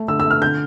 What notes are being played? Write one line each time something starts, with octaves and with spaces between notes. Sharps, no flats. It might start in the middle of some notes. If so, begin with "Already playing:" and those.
Already playing: A3
D3 E6
E6
A3
F6
D3 G6